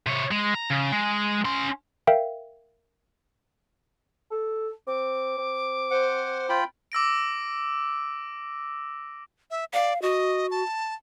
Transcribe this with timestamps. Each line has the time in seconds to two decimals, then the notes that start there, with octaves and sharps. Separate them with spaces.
0.07 C3 C#5
0.31 G#3
0.55 A#5
0.70 C#3
0.92 G#3
1.45 C#4 C6
2.07 A#4 E5 F5 G5
4.31 A4
4.87 C4 D6
5.38 C4
5.91 C5 F#5
6.49 F4 G5 B5
6.92 D6 E6 A#6 D7
9.51 E5
9.73 D5 F5
10.02 F#4 D#5
10.51 A5